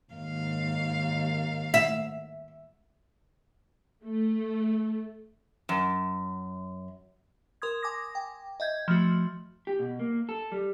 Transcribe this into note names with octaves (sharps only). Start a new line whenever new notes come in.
D#2 G#2 F5
E5
A3
F#2
A#4 C6 D#6 G#6
G#5 D6 D#6 A#6
G5
D#5 E5 G6 G#6
F3 A3 F#4
G4
B2
A#3
A4
G3